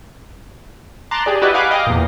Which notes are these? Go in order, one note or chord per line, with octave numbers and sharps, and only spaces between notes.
A5 A#5 C6 D6 F#6 A6
G4 G#4 D5
E4 F#4 G4 B4 D5 D#5
F5 F#5 G#5 B5 D6 F#6
D#5 F5 G5 D6 A#6
E2 A#2